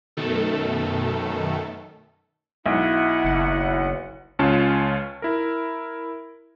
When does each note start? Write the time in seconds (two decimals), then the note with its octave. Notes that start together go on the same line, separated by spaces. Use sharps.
0.17 F#2 B2 D#3 A3 A4
2.66 B1 E4 F#5
3.24 F#1
4.39 C#2 C#4 F4 A5
5.22 E4 A#4